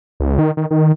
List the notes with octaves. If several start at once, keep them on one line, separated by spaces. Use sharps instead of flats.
C#2
D#3
D#3
D#3